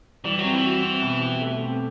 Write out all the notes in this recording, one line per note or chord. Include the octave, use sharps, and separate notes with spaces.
E3 G3
F#3 C4
E3
F#4
C4
B2
G4
A3
C4